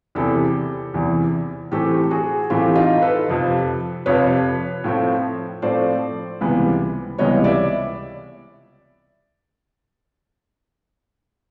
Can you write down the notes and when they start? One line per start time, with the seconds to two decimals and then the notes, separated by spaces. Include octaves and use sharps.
0.15 E2 C3 E3 G4 A4
0.94 E2 C3 E3
1.72 A2 E3 A3 C4 G4 A4
2.11 F#4 G#4
2.50 A2 E3 A3 C4 F4 G4
2.75 D#4 F4
3.02 A4 B4
3.28 F2 C3 F3
4.06 F2 C3 F3 B4 C#5
4.84 A2 F3 A3 C4
5.62 A2 F3 A3 C4 C5 D5
6.41 C#2 C3 E3 G3 B3
7.18 C#2 C3 E3 G3 B3 C#5 D#5
7.44 D5 E5